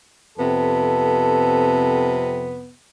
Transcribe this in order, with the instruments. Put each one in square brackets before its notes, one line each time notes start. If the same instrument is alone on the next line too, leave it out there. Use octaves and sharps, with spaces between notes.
[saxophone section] F2 C3 B3 [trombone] A4